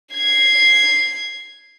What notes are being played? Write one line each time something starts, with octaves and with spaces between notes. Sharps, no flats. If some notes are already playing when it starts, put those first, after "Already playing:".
G#6 C7